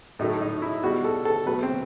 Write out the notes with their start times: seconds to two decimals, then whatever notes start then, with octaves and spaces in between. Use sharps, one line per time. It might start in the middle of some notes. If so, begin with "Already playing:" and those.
0.19 A2 F#3 A3 D#4
0.41 D#4
0.62 E4
0.83 B2 G3 F#4
1.04 A4
1.25 A4
1.46 B2 F#3 A3 B4
1.63 C4